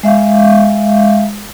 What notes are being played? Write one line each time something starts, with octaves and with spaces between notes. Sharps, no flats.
G#3 E5 F5